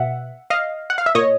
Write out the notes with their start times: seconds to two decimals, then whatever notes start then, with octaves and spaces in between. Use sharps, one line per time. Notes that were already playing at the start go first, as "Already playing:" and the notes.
Already playing: B2 E5 F#5
0.50 D#5 F5
0.90 F#5
0.98 F5
1.06 E5
1.15 A#2 C#5 D#5